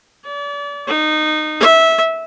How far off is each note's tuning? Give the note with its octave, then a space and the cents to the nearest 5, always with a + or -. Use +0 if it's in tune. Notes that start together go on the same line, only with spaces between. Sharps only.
D5 -35
D#4 -20
E5 -15